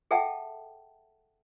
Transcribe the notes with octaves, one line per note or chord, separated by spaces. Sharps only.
G#4 A4 E5 F#5 G5 A5